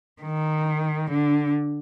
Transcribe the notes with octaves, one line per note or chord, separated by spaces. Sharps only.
D#3
D3